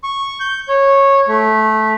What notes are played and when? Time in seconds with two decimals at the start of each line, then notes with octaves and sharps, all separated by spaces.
0.04 C#6
0.40 G6
0.68 C#5
1.28 A3